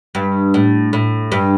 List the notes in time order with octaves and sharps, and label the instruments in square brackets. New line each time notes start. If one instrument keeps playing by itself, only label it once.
[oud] G2
A2
A2
G2